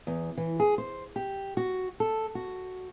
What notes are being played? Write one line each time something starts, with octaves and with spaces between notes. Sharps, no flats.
E2
E3
G#4
C5
G4
F#4
A4
F#4